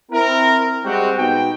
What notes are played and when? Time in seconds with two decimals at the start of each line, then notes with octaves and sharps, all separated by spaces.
0.11 C4 E4 A#4
0.84 G3 G#3 C4 F#4 G4
1.17 B2 D#4 G5